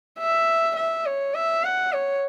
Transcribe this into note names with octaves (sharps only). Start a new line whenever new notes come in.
E5
E5
C#5
E5
F#5
C#5